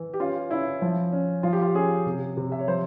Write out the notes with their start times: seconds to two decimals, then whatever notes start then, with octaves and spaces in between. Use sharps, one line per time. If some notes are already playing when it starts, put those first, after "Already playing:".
Already playing: E3
0.14 G4
0.20 C#4 F4
0.51 C#4 E4
0.82 F3
1.12 C#4
1.43 F3 F4
1.53 G4
1.62 F4
1.74 C#4 G#4
2.06 C3
2.37 C3
2.52 E5
2.59 C#5
2.68 F3 C5